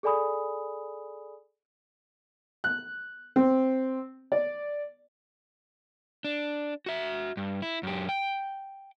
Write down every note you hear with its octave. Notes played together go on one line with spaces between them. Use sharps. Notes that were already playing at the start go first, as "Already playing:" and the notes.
G#4 A4 D5 G#5 B5 D#6
F#6
C4
D5
D4
F#4 E5
G2
E4
F#2 G4
G5